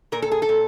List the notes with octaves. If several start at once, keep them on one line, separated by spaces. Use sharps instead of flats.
A#2 A#4
A4
G#4
A4
A#2